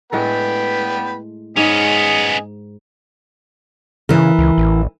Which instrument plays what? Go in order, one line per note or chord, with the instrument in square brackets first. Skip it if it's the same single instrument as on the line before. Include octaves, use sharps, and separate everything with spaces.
[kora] A2 G#3 A4 [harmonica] B3 B4 G5
[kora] G#2 [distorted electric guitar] B3 C#4 [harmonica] G#4 D#5
[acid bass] C#3 [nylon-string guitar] E3 A#4
[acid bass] C#2
A1